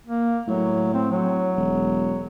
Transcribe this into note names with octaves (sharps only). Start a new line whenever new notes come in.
A#3
A2 F#3
C4
F#3
E1